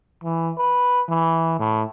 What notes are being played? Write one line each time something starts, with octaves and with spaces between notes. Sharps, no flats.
E3
B4
E3
A2